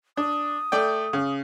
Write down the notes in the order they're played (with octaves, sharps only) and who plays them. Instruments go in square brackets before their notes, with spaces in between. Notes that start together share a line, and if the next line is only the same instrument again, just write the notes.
[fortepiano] D4 [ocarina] D#6
[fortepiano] A3 D5 G5
C#3